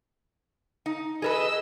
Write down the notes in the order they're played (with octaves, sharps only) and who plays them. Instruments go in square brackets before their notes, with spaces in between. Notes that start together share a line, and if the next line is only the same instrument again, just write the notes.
[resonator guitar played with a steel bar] D#4
[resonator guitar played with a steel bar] G#4 A#4 B4 [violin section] D#5 E6